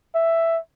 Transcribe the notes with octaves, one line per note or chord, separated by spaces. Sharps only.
E5